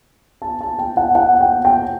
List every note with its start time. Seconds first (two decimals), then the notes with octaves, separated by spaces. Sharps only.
0.42 A5
0.61 A5
0.79 G5
0.97 F#5
1.15 F#5
1.41 G5
1.65 G5